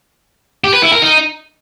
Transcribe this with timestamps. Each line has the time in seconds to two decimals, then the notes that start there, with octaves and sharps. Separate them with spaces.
0.64 G4
0.74 B4
0.83 E4
0.93 A#4
1.02 D#4